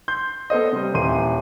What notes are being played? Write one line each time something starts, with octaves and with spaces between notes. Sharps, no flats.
C6 G6
B3 A4 C5 D#5
C3 G3
D#1 E3 C6 D#7